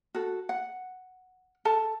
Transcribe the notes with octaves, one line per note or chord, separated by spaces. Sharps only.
F#4 A4
F#5
A4 A5